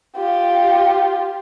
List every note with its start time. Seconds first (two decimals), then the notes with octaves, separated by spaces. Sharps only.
0.17 F4 G4